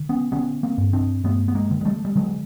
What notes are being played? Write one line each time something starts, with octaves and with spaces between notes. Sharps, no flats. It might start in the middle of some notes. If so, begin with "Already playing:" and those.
Already playing: D3
B3 C#4
D3 B3 C#4
A#3 C4
G2
C4 D4
G2 A3 B3
B3
G#3 A#3
D3
G#3
G3 A3
G3
D3 F#3 G#3